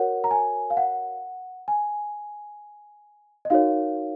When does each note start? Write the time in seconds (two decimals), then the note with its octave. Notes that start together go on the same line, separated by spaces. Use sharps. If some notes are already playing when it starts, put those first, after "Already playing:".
Already playing: F#4 A#4 C#5 F#5
0.24 A#5
0.31 G#5
0.70 F5
0.77 F#5
1.68 G#5
3.45 D#5
3.50 D#4 F#4 A#4 C#5 F5